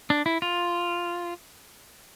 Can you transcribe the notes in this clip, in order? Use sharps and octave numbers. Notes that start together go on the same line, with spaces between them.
D4
E4
F4